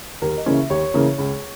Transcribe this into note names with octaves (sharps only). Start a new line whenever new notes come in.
D#2 A#4
D#5
C#3 E3 A#3 C#4
E5
D#2 C#5
C#3 E3 A#3 C#4
C#2